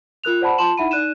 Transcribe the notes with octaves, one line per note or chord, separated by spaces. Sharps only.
F4 A#4 F#6 F7
C5 D5 F#5 A5 B5
F4 A5 C6 E7 F#7
D#4 E4 E5 F#5 B5 D#7
D#4 D5 F#6 D#7 E7